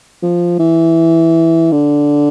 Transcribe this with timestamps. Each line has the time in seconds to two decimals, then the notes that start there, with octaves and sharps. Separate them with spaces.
0.22 F3
0.59 E3
1.72 D3